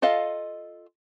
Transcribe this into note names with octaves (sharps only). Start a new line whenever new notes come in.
F4 A4 D#5 F5